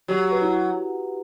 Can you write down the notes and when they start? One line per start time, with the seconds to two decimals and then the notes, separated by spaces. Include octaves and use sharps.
0.08 F#3 G4
0.31 B4
0.42 E4